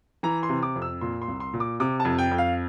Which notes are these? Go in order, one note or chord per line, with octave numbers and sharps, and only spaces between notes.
E3 A#5
C6
C3
D6
F2
E6
A#2 C6
C6
C2
C6
A#2
D6
C3 D6
A5
F2
G5
F2
F5